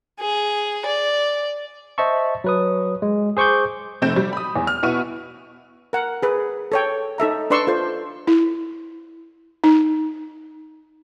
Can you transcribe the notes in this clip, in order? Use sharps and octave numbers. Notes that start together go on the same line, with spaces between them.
G#4
D5
C5 D#5 E5 A5 C#6
F#3 B4 D#6
G#3
G#4 C5 C#6 D6 G6
F1 A3 C4 G6 E7
G3
B5 D#6
E2
F6
B2 B3 E4 F#5 C#6 D#7
A#4 F#5
G#4 B4
A4 C#5 G5
D#4 A4 E5 A#5
D4 B4 D5 C6 C#6 E6
F4 A4 C5
E4
D#4